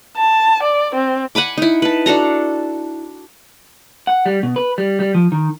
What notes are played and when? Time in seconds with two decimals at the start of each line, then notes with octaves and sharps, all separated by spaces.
0.17 A5
0.63 D5
0.95 C4
1.35 F#5 G#5 B5 D6
1.58 D#4 E4
1.82 B4 A5
2.06 D4 F#4 A4 A#5
4.07 F#5
4.26 G3
4.43 B2
4.56 B4
4.78 G3
5.00 G3
5.15 F3
5.32 D#3